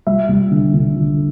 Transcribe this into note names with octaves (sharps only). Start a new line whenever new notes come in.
G3 E5
G3
D3
D3
D3